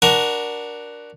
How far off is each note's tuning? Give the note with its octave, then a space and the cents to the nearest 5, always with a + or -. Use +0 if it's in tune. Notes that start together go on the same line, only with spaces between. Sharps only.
D4 +0 F#4 +5 A#4 +20